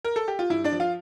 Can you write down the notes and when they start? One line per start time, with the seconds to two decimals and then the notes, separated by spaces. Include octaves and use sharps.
0.05 A#4
0.16 A4
0.28 G4
0.39 F4
0.50 G2 E4
0.64 D4 D5
0.72 F3
0.80 F4 F5